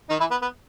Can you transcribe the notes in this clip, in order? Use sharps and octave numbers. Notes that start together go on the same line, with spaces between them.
D#3 D#4
E3 E4
B3
B3